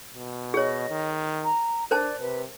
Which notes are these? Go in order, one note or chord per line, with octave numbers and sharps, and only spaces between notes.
B2
G#4 C#5 D#5
D#3
A#5
D4 A#4 C5 D5 A5
C3 B4